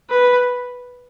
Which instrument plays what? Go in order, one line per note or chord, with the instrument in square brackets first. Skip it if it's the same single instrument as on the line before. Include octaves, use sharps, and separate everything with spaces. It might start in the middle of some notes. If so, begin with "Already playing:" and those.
[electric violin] B4